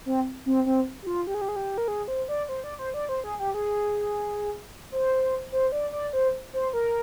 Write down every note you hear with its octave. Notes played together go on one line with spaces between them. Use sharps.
C4
C4
C4
G4
F4
G4
G#4
G4
G#4
G4
A#4
G#4
C5
D5
C5
D5
C5
D5
C5
G#4
G4
G#4
C5
C5
D5
D5
C5
C5
A#4